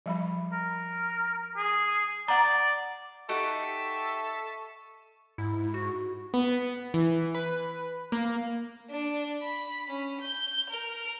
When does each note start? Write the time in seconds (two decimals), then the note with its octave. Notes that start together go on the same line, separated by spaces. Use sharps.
0.06 F3 G3 B5
0.52 A#4
1.56 G#4
2.28 D5 F#5 A#5
3.29 D#4 G4 A4 E5 F#5 C#6
5.38 G#2 E4
5.74 F#4
6.34 B3
6.94 E3
7.35 B4
8.12 A#3
8.90 D4
9.42 B5
9.90 C#4
10.21 G6
10.70 A#4